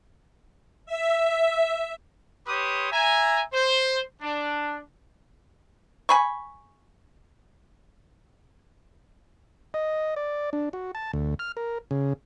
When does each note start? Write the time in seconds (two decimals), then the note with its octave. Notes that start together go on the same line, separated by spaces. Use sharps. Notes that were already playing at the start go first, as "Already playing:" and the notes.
0.86 E5
2.47 G4 B4 C#5 C6 D6 D#6
2.92 E5 G#5 A#5
3.53 C5
4.22 D4
6.09 G#5 B5 C#6
9.74 D#5
10.16 D5
10.53 D4
10.73 F#4
10.95 A5
11.13 D2
11.39 F6
11.57 A#4
11.91 C#3